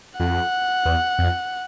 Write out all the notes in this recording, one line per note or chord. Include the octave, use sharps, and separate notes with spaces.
F2 F#5
E2
F2